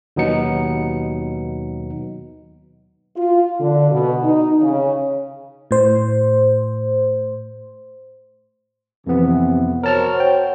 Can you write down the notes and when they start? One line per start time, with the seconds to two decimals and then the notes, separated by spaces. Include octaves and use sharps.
0.16 D#2 B2 F#3 B3 D#4 C#7
3.17 F4
3.60 D3
3.91 B2
4.23 D#4
4.61 C#3
5.71 A2 C5
9.07 F2 C3 E3 B3
9.83 F#4 A#4 C5 C#5 A5 F6
10.20 G5